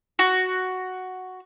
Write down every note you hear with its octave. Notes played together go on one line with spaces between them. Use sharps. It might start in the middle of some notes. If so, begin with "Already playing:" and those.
F#4